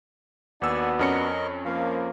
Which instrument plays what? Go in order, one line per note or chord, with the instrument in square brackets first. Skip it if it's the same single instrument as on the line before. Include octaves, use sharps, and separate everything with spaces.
[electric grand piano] D#2 E6 [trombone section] B3 D4 F#4 [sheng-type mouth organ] D5 F#5 G#5
[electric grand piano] F2 C#4 C#7 [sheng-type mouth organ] A#4 D#5
[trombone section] F3 A#3 [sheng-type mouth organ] F5